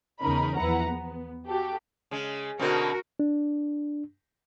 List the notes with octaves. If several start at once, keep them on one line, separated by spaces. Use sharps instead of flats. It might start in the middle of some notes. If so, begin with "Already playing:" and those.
E2 C#3 C#4 D#4 A#4 B5
E2 F3 E4 B4 F#5 A#5
B3
F#4 G4 A4
C#3 G#3
B2 D3 C4 F#4 A#4
D4